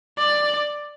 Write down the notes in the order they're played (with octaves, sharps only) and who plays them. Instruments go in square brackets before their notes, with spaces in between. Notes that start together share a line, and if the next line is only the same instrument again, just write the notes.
[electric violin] D5